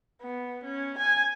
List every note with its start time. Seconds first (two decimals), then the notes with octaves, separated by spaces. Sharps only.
0.21 B3
0.64 C#4
0.98 G#5